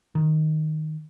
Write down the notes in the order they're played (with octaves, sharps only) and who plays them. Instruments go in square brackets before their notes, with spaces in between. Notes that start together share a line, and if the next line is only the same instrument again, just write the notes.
[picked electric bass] D#3